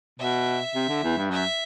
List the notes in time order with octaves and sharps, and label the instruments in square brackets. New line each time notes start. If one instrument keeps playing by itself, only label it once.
[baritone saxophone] B2 [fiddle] E5
[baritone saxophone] C3
D3
E2
G2
[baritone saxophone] F#2 [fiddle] E5